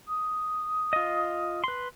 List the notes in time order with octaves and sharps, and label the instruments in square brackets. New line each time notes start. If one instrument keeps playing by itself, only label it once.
[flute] D#6
[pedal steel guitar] F4 D#5
B4 C6